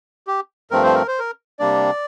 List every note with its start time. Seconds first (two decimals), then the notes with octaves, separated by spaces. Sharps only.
0.27 G4
0.71 G2 F3 A3 C4 A#4
0.83 C5
0.95 A#4
1.08 C5
1.19 A#4
1.59 C3 G3 A#3 D4 D5